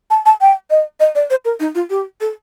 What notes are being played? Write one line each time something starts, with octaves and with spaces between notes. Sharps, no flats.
A5
A5
G5
D#5
D#5
D5
C5
A#4
D#4
F4
G4
A4